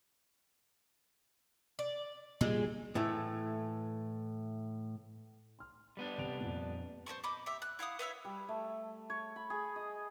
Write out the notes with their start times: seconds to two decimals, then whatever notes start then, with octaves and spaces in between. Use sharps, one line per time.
1.79 D5
2.41 A#2 G3 G#3
2.95 A2 E3 A3
5.59 C6 F6
5.97 G3 B3 D4
6.18 C3 D7 F7
6.40 F2 A#2
7.06 C5 D#5 A5 C#6
7.23 D#5 B5 D6
7.46 G4 E5
7.62 F#6
7.79 E4 F5 F#5 D#6
7.99 B4 C#5 E5 F5
8.25 G3
8.49 A3
9.10 C#5
9.36 B5
9.50 G#4
9.76 D#5